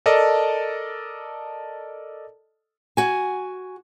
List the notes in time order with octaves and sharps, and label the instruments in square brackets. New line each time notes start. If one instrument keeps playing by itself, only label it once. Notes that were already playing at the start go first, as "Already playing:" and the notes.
[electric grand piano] A4 A#4 D5 D#5 A5
[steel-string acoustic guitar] F#4 G#5